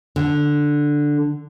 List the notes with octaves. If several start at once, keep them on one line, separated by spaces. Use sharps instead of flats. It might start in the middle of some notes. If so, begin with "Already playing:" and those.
D3